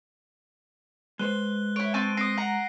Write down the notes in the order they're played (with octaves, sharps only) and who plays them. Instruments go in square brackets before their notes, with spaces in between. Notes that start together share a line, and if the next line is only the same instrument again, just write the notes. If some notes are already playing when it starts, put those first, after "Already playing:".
[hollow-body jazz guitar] G#3 B4 C5 [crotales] F#6 G7
[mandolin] E4 C#5 [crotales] D7
[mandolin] C4 A5 C#6 [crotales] D#7
[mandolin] C4 D#6 [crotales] A#6 C7 D7
[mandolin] F#5 A#5